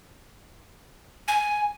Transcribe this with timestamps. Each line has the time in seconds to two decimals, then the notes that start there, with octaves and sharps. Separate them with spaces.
1.28 G#5